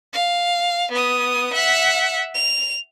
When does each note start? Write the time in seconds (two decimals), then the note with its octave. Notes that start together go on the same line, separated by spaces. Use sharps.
0.14 F5
0.92 B3 D#6
1.53 E5 F#5
2.35 F7